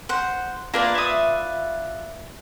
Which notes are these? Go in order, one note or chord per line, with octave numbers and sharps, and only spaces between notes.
C5 F#5
A#3 D4 F4 A#4 B4 D5
E5 D#6